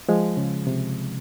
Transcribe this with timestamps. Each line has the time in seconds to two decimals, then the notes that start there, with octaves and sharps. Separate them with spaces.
0.09 F3 G#3
0.37 C#3
0.67 C3